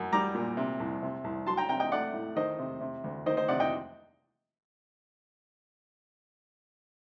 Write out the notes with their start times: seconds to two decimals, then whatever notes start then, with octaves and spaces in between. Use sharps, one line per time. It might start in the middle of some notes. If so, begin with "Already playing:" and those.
Already playing: F#2
0.12 G3 A#5 D6
0.35 A#2
0.57 C3
0.80 C2
1.02 C3
1.24 C2
1.46 F#3 A5 C6
1.57 G5 A#5
1.69 C3 G5 A#5
1.80 D#5 G5
1.92 A3 D5 F#5
2.14 A2
2.36 D#3 C5 D#5
2.59 C3
2.81 C3
3.04 D2
3.26 D#3 C5 D#5
3.37 C5 D#5
3.48 C3 D5 F#5
3.60 D#5 G5